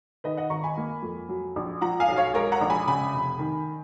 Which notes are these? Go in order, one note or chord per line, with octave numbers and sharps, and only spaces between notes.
D#3 B4 D#5
D#5 F#5
G#1 A#5 C#6
G#5 B5
A#3
F2
F#3
A#1
F3 F#5 A#5
F5 G#5
B1
C#5 F5
G#3 A#4 C#5
F#5 A#5
A#1
G#5 B5
C#3 G#5 B5
F1
D#3